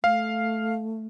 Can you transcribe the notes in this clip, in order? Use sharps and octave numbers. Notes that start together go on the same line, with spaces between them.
A3 F5